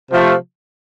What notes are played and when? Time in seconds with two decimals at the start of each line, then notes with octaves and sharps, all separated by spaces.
0.10 C3 F3 A3